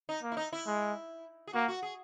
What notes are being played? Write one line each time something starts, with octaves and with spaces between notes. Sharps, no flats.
D#4
A#3
E4
D#4
E4
G#3
G#4
A#3 F#4
F#4
G#4